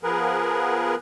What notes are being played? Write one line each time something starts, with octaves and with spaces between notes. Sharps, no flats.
F3 B3 G#4 A#4 B4